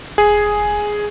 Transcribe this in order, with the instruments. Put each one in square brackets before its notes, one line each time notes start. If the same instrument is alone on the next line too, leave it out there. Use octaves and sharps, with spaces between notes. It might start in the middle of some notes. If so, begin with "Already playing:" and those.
[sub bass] E1 [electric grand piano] G#4